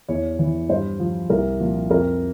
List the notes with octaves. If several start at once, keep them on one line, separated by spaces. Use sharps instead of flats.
E2 C#5
E3
G2 C5
F3
C2 A#4
A#2 F3
F2 A#4